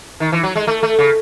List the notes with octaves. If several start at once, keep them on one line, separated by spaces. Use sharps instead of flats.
D#3
E3
F#3
G#3
A3
A3
C#3